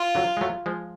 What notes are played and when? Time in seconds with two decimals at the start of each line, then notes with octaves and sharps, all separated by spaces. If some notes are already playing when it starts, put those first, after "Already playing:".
Already playing: F4
0.15 D3 F#3
0.37 G#3
0.41 F#3 A3
0.66 F3 G#3